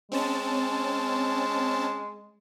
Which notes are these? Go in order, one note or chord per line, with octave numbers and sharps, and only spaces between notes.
G#3 C4 C#4 A5